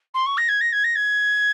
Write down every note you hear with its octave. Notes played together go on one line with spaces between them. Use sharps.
C6
C#6
A#6
G#6
A#6
G#6
A#6
G#6